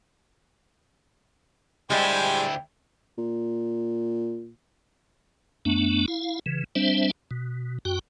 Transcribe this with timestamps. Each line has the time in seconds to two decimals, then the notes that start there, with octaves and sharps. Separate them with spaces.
1.90 D2 G3 G#3 E4 G4 C5 G5 G#5
3.18 A#2
5.65 F#2 A3 B3 D4
6.08 E4 F5
6.46 C#3 E3
6.75 G3 C4 D4 C5 E5
7.31 B2
7.85 F#2 F#4 G5